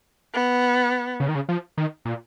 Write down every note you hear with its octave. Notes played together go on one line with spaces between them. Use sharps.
B3
C#3
D#3
C#3
F3
D#3
A#2